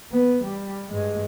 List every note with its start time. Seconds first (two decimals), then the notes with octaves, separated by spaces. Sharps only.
0.12 B3
0.44 G3
0.91 G2 G#3